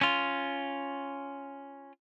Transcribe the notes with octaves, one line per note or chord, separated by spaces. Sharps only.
C#4 F4